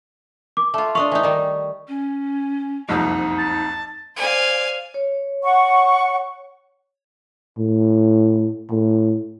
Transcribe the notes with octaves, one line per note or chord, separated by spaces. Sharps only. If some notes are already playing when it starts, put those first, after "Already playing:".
D6
A3 F4
D4 D#5 F5 C#6
E3 D#4
D#3 G3
C#4
F#1 C2 F2 D#4
A5
C5 D5 F5 G#5
C#5
F#5 C#6
A2
A2